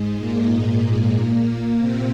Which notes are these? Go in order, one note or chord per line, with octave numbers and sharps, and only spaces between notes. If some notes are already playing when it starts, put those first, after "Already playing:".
Already playing: G#2 G#3
A#2 A#3
C3 C4